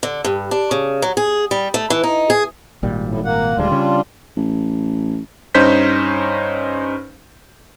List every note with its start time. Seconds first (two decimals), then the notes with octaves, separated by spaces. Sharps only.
0.03 D3
0.24 G2
0.51 D4
0.71 C#3
1.02 F#3
1.17 G#4
1.51 G3
1.74 A3
1.90 E3
2.04 D#4
2.30 G#4
2.83 G#1 A#2 G3
3.07 A2
3.25 A#3 F#5
3.57 D#1 D2 G3 G#3 D4 F4
3.71 C#3 C#4
4.37 A1
5.54 G2 C#4 D#4 C5 G6 B6